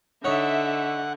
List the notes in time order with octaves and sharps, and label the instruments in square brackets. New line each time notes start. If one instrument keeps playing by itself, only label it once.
[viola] D3 [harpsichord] D#4 C#5 [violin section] E5 [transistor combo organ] F#5